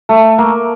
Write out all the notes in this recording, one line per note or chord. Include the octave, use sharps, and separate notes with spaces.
A3
A#3